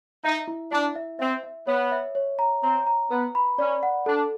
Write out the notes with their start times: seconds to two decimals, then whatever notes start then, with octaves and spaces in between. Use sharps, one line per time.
0.24 D#4 E5
0.48 E4
0.72 D4 E4
0.95 E5
1.19 C4 E5
1.43 E5
1.67 B3 C#5
1.92 E5
2.15 C#5
2.39 A#5
2.63 C4 A#5
2.87 A#5
3.11 B3 B4
3.35 B5
3.58 C#4 D5
3.83 F#5
4.06 D4 A4